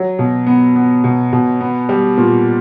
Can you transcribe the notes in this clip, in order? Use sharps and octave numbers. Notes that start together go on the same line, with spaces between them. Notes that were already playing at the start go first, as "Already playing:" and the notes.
Already playing: F#3
B2
B3
B3
B2
B2
B3
G3
A#2